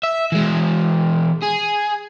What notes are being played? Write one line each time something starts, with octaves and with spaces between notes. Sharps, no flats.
E5
E3 G#3
G#4